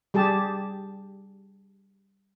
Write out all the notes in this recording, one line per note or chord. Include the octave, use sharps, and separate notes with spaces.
G3 G4 G#4 A5